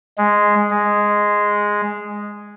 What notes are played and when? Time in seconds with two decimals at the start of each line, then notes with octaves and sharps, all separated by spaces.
0.18 G#3
0.70 G#3